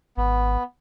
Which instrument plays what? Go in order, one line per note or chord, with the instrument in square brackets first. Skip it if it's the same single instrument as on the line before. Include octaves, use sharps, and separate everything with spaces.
[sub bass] G#1 [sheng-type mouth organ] B3